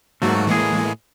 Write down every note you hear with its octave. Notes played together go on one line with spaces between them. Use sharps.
G#2 F#3 A3 A#3 F#4
A2 E3 G#3 A#3 G#4